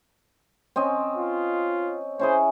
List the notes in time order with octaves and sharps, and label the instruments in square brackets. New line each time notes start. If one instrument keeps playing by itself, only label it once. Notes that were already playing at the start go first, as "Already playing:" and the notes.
[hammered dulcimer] C4 C#4 D#5
[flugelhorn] F4
[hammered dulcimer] C#4 E4 G#4 [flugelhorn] C5